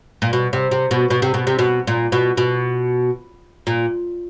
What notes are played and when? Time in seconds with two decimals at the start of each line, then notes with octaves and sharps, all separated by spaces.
0.22 A#2
0.33 B2
0.53 C3
0.71 C3
0.91 B2
1.10 B2
1.22 C3
1.34 B2
1.47 C3
1.59 B2
1.87 A#2
2.12 B2
2.37 B2
3.67 A#2